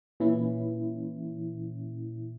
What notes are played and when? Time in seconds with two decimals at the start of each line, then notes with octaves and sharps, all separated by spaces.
0.20 A#2 E3 C#4 E4